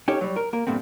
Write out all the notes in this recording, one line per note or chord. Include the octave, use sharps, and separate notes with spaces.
C#4 D#4 G4 A4 C#5
F#3 G3
A#4
A#3 A#4
G2 A#2 A3 B3 C4